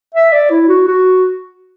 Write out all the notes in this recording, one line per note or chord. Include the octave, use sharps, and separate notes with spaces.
E5
D5
E4
F#4
F#4